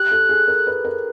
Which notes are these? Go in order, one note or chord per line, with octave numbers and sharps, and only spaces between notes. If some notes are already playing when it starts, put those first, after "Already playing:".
Already playing: G4 F#6
A4
G#4
A#4
B4
A#4